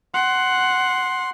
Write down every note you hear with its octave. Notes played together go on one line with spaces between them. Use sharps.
F#5 C6